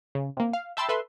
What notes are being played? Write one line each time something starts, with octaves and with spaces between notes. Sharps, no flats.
C#3
C3 A#3
F5
E5 G5 A5 B5 C6 E6
A4 B4 E5 C6